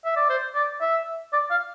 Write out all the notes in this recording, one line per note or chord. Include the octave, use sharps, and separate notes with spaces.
E5
D5
C5
D5
E5
D5
F5